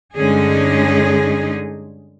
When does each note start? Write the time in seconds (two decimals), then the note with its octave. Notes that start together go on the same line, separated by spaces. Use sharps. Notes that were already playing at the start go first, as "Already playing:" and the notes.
0.16 G2 D3 G#3 C#4 D#4 G#4